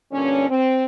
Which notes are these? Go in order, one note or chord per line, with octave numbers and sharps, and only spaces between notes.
G2 A#2 D3 C#4
C4